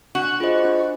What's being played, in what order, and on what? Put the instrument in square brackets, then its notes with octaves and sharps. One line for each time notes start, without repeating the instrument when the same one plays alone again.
[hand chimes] D4 [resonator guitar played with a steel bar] F#4
[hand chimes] F4 G#4 C5 D#5
D4